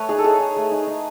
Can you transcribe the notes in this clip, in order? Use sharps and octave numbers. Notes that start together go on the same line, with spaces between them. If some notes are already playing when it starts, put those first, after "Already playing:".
Already playing: A3 B4 C#5
D#4 G#4
A4
D#4 G#4
D#4
A3
D#4
D#4